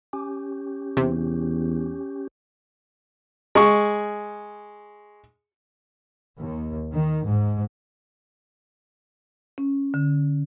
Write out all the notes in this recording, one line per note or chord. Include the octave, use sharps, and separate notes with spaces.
C#4 G4
E2 C3
G#3 C#6
D#2
D#3
G#2
C#4
D3